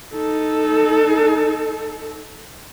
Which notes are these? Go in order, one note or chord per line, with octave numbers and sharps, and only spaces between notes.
D#4 A4